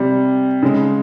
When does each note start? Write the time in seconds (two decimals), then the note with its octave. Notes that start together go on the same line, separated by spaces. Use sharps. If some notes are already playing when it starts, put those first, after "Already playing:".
Already playing: C3 G3
0.63 C#3 G#3